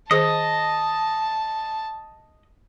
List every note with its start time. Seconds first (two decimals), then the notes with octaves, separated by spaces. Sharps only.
0.11 D#3 G#4 C5 D#5 A5